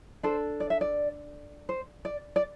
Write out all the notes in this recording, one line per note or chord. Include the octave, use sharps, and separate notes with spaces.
D4 A4 C5
D5
E5
D5
C5
D5
D5